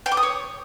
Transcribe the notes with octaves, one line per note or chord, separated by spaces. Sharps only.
G5
D6
D#6
C#5